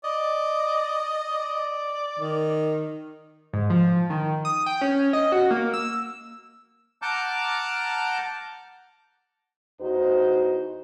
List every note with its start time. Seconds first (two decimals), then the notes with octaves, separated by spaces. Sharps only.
0.04 D5 D#5
1.31 D5
2.19 D#3
3.53 G#2
3.70 F3
4.10 D#3
4.45 D#6
4.66 G5
4.81 C#4
5.13 D#5
5.32 F#4
5.51 A#3
5.73 E6
7.02 F#5 A5 A#5 D6 F6 G6
9.81 E2 D#4 F#4 C5